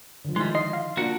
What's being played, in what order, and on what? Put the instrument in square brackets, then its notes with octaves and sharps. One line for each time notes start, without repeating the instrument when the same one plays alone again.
[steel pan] D3 F3
[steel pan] D#3 D#4 E4 [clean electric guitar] G3 G#3 [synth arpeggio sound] C6
[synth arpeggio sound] D#5 [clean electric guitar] C6
[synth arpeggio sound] F5
[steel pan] A#3 D4 F4 [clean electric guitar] F#4 A#4 F#5